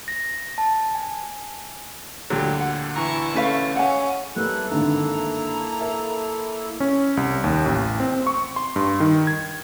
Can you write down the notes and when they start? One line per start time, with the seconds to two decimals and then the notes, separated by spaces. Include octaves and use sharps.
0.08 A#6
0.58 A5
0.95 G#5
2.30 D2 A#2 D3 F#3 G3 G4
2.61 F#5
2.96 E3 E4 A#5 C#6
3.34 A3 C#4 B4 F5
3.76 G#3 C#4 F#5 G#5
4.36 G3 A#3 B3 E4 A4 F#6
4.70 G#1 G2 D3 A#5
5.81 A#4 E5
6.80 C#4
7.17 C2
7.44 D#2
7.66 A1
8.00 C4
8.27 C#6
8.56 C6
8.76 G2
9.00 D#3
9.27 G#6